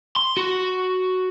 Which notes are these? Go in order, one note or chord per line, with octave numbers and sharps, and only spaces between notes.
C6
F#4